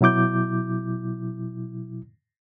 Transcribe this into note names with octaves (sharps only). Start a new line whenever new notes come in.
B2 F#3 E4 D6 G6